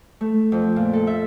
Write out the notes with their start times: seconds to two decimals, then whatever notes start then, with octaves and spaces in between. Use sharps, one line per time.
0.21 A3
0.52 F2
0.76 A#2
0.93 A4
1.07 E5